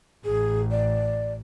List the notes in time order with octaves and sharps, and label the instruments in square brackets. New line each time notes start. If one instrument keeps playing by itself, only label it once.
[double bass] A1 [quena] G#4
[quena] D5